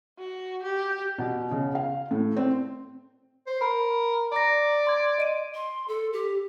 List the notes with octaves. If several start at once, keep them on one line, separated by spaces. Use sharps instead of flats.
F#4
G4
B2
C#3
F5
A2
C4
C5
A#4 B5
D5 A#5 A#6
C6 G#6
D#5 D7 D#7
C6
A4
G4